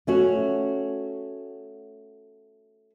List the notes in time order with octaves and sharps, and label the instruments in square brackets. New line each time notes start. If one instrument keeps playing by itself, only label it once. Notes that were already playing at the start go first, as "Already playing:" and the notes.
[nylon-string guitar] A3 C#4 F#4